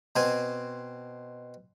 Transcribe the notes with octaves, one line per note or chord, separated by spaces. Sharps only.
B2 C4 G#5